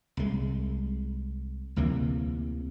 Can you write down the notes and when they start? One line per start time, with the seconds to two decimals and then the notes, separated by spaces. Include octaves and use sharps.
0.17 C2 G#3
1.76 D2 C3 E3 A#3